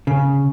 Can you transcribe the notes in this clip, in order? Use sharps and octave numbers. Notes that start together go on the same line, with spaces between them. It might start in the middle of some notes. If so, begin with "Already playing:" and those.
C#3